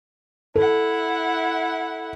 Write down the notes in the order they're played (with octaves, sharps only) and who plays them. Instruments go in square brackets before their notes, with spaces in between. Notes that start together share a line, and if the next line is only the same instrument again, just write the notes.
[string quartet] E4 F#5 [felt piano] A4